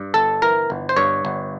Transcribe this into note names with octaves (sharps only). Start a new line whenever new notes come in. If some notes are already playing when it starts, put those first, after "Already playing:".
Already playing: G2
G1 A4
E3 A#4
G1
C5
G2 C#5
G1